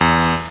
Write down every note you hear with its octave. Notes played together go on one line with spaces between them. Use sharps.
E2